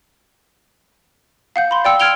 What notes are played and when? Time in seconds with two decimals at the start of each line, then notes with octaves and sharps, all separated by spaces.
1.56 F5 F#5 G6
1.71 B5 C6
1.85 D5 G5 E6 C#7
2.00 F6 G#6 D7 F7 G7